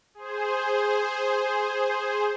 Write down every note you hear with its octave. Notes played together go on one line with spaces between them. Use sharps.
G#4 C5